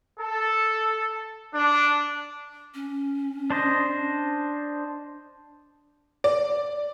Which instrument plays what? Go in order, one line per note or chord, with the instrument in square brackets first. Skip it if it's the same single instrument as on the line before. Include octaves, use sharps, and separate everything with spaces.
[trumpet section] A4
D4
[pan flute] C#4
[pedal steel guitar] D4 C5 D#5
[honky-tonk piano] D5